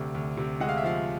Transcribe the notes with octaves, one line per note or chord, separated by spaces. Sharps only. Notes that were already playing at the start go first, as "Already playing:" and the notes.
Already playing: D2 C3
D2
C3
G#3 F#5
F5
E5
F3 F5